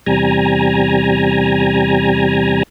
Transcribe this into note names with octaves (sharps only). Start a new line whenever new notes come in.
E2 C3 G3 G#5 A#5